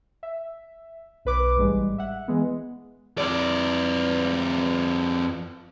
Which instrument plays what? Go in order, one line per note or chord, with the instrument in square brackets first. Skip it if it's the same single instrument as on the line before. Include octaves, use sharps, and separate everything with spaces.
[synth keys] E5
B1 B4 D6
A1 G#2 G3 G#3
E5 F#5
E3 G#3 B3
[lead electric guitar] F2 D5